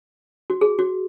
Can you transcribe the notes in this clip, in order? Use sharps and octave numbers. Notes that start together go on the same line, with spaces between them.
F#4
G#4
F#4